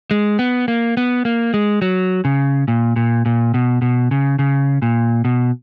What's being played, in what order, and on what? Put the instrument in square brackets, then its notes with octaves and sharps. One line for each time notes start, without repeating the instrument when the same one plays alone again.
[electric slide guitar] G#3
B3
A#3
B3
A#3
G#3
F#3
C#3
A#2
A#2
A#2
B2
B2
C#3
C#3
A#2
B2